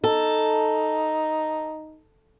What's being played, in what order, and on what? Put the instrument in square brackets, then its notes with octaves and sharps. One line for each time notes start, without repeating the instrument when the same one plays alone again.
[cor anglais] D#4 [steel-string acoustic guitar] A4